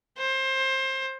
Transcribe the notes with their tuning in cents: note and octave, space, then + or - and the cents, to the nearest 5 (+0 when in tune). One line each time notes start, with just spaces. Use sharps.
C5 +25